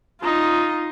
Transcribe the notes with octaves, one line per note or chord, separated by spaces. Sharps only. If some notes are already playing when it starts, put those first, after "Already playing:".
D#4 F4